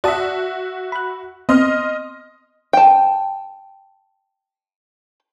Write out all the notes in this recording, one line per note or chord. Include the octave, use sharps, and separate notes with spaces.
F#4 D5 E5 A5 D#6
B5 F#6
B3 C4 D#5 C6 F6
G5 A5